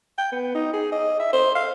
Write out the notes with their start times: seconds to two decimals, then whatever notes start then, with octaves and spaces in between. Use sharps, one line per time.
0.18 G5
0.32 B3
0.55 D#4
0.73 G#4
0.92 D#5
1.20 E5
1.33 C5
1.55 F5